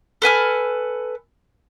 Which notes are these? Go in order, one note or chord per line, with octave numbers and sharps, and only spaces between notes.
A4 B4 G#5 F6